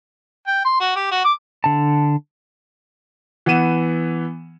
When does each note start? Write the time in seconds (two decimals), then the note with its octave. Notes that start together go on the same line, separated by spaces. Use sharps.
0.47 G5
0.65 C6
0.80 F#4
0.96 G4
1.11 F#4
1.24 D6
1.64 D3 A5
3.46 E3 B3 F#5 D#7 E7